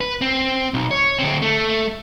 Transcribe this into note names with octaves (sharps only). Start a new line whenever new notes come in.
B4
C4
B1
C#5
D2 C4
A3